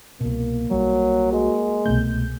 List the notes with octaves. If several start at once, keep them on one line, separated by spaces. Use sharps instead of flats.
C2 B2 A#3
B1 F#3 G3
G#3 F#4
C2 B2 A3 G6